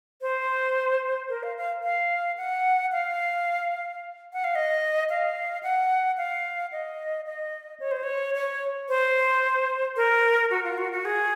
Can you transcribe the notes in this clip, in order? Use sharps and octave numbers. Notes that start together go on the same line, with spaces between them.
C5
A#4
F5
F5
F5
F#5
F5
F#5
F5
D#5
F5
F#5
F5
D#5
D#5
C#5
C5
C#5
C#5
C5
A#4
F#4
F4
F#4
F#4
G#4